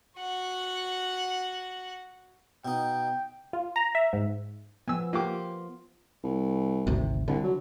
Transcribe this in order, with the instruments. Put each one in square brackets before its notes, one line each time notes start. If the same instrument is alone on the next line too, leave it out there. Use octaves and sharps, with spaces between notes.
[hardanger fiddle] F#4 F#5
[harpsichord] B2 D#4 [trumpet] G5
[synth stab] F4
A#5
E5
G#2
[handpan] F3 B3 [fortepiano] G#5 E6
[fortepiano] A#3 G4 D6 [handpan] F4
[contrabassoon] C2
[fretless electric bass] G#1 D2 C3
[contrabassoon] C2 [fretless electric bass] D3
[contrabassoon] F#3